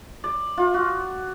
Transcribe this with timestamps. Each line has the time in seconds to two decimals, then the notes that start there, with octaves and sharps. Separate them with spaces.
0.24 D5
0.57 F4
0.74 F#4